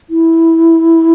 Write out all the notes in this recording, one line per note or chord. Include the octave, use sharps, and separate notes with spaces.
E4